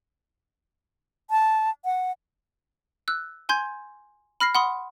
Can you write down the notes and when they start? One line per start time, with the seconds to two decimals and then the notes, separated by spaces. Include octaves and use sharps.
1.30 A5
1.85 F#5
3.08 E6 F#6
3.49 G#5 C6 G6 G#6
4.40 B5 F6 A#6 C7
4.55 F#5 B5 C6 D#6